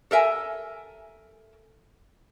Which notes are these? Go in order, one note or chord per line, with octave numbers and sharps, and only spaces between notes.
A4 A#4 E5 G#5